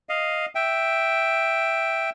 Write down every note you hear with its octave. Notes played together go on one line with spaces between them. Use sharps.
D#5 F5
E5 G5